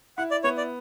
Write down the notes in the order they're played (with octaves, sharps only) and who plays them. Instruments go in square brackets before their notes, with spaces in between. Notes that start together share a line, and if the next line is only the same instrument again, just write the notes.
[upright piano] E4 [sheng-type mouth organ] F#5
[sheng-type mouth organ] D5
[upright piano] B3 [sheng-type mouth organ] C#5
[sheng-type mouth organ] D5